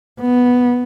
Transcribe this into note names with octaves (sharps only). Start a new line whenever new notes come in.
B3